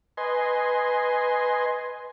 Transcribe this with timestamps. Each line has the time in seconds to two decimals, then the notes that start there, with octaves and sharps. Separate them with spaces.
0.17 B4 D#5 G#5 C6